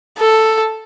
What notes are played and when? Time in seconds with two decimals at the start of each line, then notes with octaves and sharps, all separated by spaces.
0.18 A4